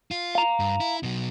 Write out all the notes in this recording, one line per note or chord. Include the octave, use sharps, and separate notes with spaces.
F4
F5 A#5
G2
E4
B2 F#3